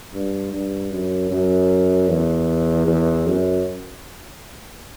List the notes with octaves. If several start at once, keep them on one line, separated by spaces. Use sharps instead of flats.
G2
G2
F#2
F#2
E2
E2
F#2